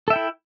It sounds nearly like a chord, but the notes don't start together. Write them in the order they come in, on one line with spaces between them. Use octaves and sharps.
A4 E5 G5 E4